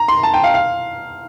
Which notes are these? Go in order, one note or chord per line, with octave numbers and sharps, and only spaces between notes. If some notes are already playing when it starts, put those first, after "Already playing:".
Already playing: A#5
C6
A5
G5
F5
F5